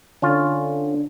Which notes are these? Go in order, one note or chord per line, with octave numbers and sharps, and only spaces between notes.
D3 C#4 F4